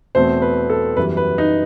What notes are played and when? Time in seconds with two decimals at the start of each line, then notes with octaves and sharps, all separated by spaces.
0.15 E2 B2 A3 C4 C5
0.42 B4
0.70 A4
0.97 F#2 E3 G3 B3 B4
1.17 B4
1.38 D#4